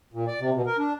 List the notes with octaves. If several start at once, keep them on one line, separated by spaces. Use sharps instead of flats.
A#2
D5
C3
B2
A#4
D4